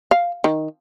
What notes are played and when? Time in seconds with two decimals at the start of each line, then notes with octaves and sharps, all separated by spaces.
0.11 F5
0.44 D#3